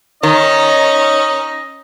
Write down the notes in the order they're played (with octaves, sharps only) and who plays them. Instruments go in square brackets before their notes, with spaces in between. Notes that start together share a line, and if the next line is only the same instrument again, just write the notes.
[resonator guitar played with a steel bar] D#3 [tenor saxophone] C#4 [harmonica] D#4 D#5